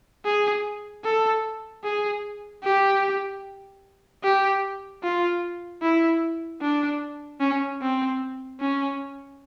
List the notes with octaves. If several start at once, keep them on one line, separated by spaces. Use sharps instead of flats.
G#4
A4
G#4
G4
G4
F4
E4
D4
C#4
C4
C#4